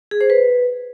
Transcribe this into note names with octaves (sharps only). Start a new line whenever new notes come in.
G#4
C5
B4